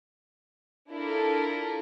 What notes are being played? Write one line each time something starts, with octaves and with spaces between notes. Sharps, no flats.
D4 E4 F4 A4 A#4